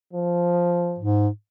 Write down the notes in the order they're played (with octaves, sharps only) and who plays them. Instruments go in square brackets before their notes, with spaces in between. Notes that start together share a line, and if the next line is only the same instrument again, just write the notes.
[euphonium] F3
[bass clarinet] G#2